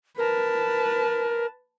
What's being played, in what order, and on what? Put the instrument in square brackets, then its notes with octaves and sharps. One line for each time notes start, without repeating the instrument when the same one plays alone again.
[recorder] A#4 [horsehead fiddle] B4 A5